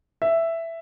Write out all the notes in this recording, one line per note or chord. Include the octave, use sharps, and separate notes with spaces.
E5